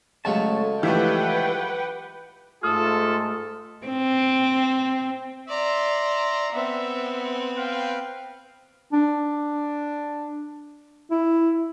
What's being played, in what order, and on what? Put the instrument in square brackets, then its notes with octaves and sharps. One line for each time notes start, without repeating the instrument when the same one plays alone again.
[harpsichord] C#3 F#3 G#3 [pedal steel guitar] A3 C#5 A5
[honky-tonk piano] E3 F3 A3 [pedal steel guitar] G4 E5 [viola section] B4 F#5 G5
[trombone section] G#2 A3 [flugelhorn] F4 [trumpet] A4 [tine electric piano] D#6 F6
[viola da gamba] C4
[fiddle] D5 A#5 [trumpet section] E5 C6
[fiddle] B3 C4 [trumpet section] E5
[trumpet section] B4 F5 G5
[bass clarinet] D4
E4